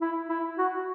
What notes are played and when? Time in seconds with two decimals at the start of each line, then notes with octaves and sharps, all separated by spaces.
0.01 E4
0.29 E4
0.58 F#4